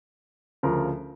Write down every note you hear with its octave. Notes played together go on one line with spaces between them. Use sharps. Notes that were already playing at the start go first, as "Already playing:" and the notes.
D2 C#3 F3 A#4